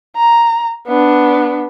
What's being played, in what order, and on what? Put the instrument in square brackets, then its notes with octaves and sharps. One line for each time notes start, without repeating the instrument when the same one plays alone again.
[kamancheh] A#5
B3 D4